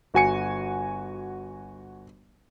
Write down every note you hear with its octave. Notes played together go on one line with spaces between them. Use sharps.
G1 F#4 G#5 C#7